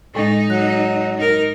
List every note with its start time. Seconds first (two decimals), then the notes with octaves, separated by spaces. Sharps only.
0.15 A2 G#3 D#4 A6
0.50 F#3 F#6
1.18 D#4 A#4